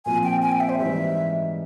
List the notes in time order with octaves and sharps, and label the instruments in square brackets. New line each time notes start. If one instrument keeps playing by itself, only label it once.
[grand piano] A#2 F3 C4 [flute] G#5
[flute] G5
G#5
G5
E5
C5
[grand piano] G#2 E3 G3 [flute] E5